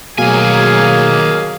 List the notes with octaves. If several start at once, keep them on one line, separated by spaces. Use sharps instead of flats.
D#2 B2 F#3 A3 A#3 G#4 F5 G#5